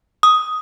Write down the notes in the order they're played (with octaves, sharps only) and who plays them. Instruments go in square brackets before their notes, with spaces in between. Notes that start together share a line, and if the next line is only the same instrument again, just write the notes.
[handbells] D#6